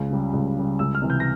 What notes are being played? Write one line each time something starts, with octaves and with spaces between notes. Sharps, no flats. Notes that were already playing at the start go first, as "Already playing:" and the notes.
Already playing: C#2
C#3 G3
C#2
C#3 G3
C#2 E6
F6
C3 E3
G6
A#6